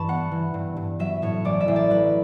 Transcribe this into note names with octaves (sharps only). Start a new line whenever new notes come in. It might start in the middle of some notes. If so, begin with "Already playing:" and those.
Already playing: G2 E3 A5 B5 C#6
B3 F#5
E3
G2
G2
F#3 E5
A2 C#5
A1 D5
E5
A1
D5
F#3 B4